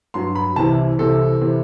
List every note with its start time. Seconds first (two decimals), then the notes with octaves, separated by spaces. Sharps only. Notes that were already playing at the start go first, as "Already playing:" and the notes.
0.14 G2 F#3 C6
0.35 B5
0.56 C2 C3 E3 A5
0.99 C2 C3 E3 A4
1.41 C3 E3